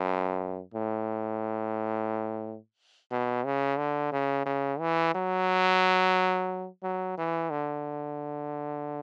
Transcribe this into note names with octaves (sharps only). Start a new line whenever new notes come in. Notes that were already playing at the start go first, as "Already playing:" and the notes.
Already playing: F#2
A2
B2
C#3
D3
C#3
C#3
E3
F#3
F#3
E3
D3